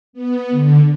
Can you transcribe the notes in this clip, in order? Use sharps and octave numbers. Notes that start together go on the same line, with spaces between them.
B3
D3